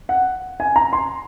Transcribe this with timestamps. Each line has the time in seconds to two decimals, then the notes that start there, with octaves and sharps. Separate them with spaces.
0.09 F#5
0.60 G#5
0.76 A#5
0.93 C6